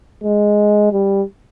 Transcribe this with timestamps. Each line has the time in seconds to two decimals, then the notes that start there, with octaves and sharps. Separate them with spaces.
0.24 G#3
0.92 G3